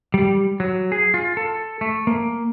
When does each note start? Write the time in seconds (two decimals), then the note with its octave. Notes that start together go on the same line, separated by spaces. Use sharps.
0.14 G3
0.60 F#3
0.92 G#4
1.14 F4
1.37 A4
1.81 A3
2.07 A#3